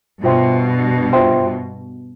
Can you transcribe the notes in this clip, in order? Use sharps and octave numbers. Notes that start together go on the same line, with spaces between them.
G2 B2 F4 C5 E5 G5 C6
F4 C5 E5 G5 C6